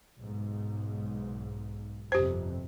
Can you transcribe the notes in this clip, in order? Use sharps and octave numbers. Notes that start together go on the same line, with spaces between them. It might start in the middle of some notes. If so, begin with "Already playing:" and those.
B1 G#2
G1 F2 C3 G4 C5